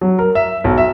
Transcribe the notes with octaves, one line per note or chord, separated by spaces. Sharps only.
F#3
A#4
E5
B1
E5